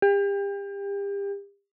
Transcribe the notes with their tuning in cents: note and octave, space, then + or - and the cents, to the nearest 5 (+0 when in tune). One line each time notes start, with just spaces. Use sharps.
G4 +35